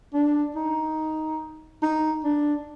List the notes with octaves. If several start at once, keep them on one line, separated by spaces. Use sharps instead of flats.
D4
D#4
D#4
D4